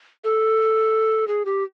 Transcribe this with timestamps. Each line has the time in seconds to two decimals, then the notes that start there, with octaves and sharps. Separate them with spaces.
0.24 A4
1.28 G#4
1.45 G4